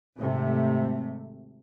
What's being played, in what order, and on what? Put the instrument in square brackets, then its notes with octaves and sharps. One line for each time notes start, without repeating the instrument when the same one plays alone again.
[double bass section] G#1 C3 A3